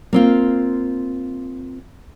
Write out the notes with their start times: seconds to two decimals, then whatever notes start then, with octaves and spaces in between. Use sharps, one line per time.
0.13 A#3 C4 F4